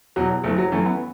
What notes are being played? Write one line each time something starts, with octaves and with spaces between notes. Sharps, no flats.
E2 B2 F#3
F#1 A3
F#3
F#2 E3 A3
B3